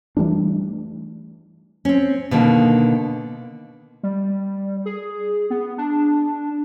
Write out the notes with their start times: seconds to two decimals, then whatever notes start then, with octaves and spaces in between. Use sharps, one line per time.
0.17 E3 G3 A3 D4
1.85 C4 C#4
2.31 B2 D3 D#3 A#3
4.03 G3
4.86 G#4
5.50 B3
5.78 D4